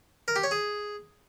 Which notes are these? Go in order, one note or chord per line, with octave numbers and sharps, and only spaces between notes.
A#4
G4
C#5
G#4